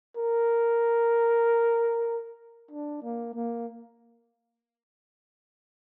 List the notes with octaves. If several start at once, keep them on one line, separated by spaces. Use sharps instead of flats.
A#4
D4
A#3
A#3